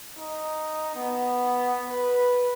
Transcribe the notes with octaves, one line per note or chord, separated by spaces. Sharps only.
D#4
B3
B4